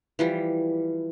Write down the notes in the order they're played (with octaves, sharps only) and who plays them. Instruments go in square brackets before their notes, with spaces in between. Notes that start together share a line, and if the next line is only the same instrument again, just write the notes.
[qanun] E3 F3 G3